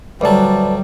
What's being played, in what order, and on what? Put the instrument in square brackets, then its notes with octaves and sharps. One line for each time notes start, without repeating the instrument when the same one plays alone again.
[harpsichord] D2 F#3 [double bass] G3 [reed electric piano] B4 D5 A5